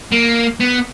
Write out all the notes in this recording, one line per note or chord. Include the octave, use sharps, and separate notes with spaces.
A#3
B3